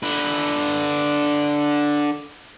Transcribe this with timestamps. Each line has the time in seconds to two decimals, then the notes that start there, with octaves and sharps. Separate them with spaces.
0.03 D3 B4